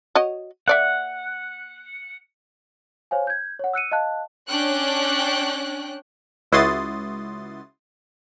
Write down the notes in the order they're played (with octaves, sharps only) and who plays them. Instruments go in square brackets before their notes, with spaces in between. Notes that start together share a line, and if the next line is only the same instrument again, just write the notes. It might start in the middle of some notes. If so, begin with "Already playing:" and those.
[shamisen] F#4 C#5 D#5
[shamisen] A#3 D5 E5 [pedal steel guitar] F#5
[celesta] C5 C#5 F5 G#5
G6 G#6
C#5 F#5
E6 F#6 C#7 D#7
D#5 F5 A5 F#6
[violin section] C#4 D4 G5 F#6
[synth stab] C#2 E4 F#4 C6 D#6 A6